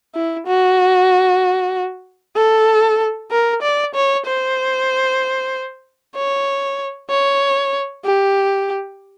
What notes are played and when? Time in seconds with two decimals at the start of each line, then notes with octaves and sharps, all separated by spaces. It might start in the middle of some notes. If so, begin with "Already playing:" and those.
0.15 E4
0.46 F#4
2.36 A4
3.31 A#4
3.62 D5
3.95 C#5
4.26 C5
6.15 C#5
7.10 C#5
8.05 G4